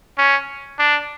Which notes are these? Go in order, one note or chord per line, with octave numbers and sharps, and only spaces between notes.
C#4
D4